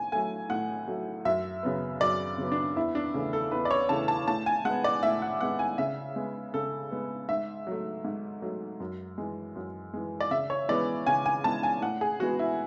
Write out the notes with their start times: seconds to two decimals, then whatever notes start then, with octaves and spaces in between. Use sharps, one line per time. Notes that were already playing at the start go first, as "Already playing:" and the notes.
Already playing: A2 G#5
0.12 F#3 A3 G#5
0.50 A2 F#5
0.88 F#3 A3
1.25 F#2 E5
1.63 C#3 F#3 B3
2.01 F#2 D5
2.38 C#3 F#3 B3
2.52 D4
2.76 E2 E4
2.95 D4
3.14 C#3 E3 A3
3.33 A4
3.52 E2 B4
3.65 D5
3.71 C#5
3.89 C#3 E3 A3 A5
4.08 A5
4.28 A2 A5
4.46 G#5
4.65 G#3 B3 F#5
4.84 D5
5.03 A2 E5
5.22 F#5
5.41 G#3 B3 F#5
5.59 G#5
5.78 C#3 E5
6.16 G#3 B3
6.54 C#3 A4
6.91 G#3 B3
7.29 G#2 E5
7.67 F#3 A3
8.04 G#2
8.42 F#3 A3
8.80 F#2
9.18 E3 G#3
9.56 F#2
9.93 E3 G#3
10.20 D5
10.31 C#3 E5
10.50 C#5
10.68 E3 G#3 B3 D5
11.06 C#3 G#5
11.26 G#5
11.44 E3 G#3 B3 A5
11.63 G#5
11.82 A2 F#5
12.01 G#4
12.20 E3 G#3 B3 F#4
12.39 E4